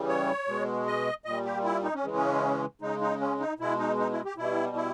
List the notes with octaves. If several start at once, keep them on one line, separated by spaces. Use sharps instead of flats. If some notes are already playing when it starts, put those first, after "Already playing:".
Already playing: C#3 E3 G3
C#5
B2 G#3
D#5
A#2 G3 D#5
G4
E4
D#4
C#4
C#3 E3 G#3
C#4
C#3 G#3 D#4
D#4
C#4
D#4
B2 G#3 E4
D#4
D#4
E4
G4
B2 G3 E4
E4